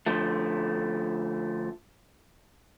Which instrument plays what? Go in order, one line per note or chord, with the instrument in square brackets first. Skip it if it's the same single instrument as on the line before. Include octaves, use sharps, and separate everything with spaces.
[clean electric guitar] D3 F3 A3